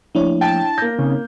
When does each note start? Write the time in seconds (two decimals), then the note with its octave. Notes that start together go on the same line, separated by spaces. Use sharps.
0.15 F3 A3 A#3 D4 E4 C#5
0.41 G5 A5
0.78 A#3 G6 A#6
0.98 C#3 C4 D#4